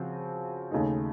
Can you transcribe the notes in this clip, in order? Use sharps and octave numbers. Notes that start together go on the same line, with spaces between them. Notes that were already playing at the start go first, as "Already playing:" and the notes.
Already playing: C#3 F3 C4 F#4
D#2 C#3 A3 D#4